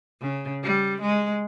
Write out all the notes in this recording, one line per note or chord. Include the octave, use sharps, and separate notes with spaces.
C#3
G3
G#3